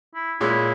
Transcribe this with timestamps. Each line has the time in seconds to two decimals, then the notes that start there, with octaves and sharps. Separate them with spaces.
0.14 E4
0.41 A#2 G#3 C#4 E4